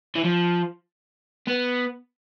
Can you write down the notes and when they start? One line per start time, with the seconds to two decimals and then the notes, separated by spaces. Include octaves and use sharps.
0.16 E3
0.24 F3
1.48 B3